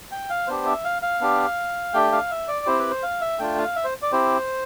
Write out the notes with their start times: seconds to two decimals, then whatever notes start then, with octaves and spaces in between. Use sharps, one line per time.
0.12 G5
0.30 F5
0.47 B3 D4 G4 C5
0.66 E5
0.84 F5
1.02 F5
1.21 B3 D4 G4
1.94 A3 D4 G4 G5
2.12 F5
2.31 E5
2.48 D5
2.66 C4 E4 G4 C5
2.79 B4
2.91 C5
3.03 F5
3.21 E5
3.39 A3 D4 F4 G5
3.58 F5
3.76 E5
3.84 C5
4.02 D5
4.12 C4 E4 G4 C5